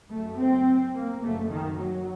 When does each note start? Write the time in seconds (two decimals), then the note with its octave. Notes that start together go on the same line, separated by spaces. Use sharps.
0.10 F#1 F#2 A3
0.38 C4
0.94 A#3
1.22 F#1 F#2 A3
1.50 D#3
1.79 F#3